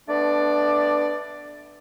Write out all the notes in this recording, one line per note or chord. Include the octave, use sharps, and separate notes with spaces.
A3 B3 D4 D5